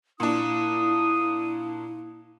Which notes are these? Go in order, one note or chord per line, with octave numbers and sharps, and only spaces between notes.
A#2 D4 E4 D#6